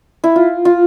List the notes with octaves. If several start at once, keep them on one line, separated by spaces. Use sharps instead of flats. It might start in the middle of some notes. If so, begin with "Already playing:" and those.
E4
F4
F4